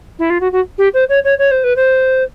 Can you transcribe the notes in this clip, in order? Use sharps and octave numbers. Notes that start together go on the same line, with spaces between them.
E4
F4
F#4
F#4
G4
C5
C#5
C#5
C#5
C5
B4
C5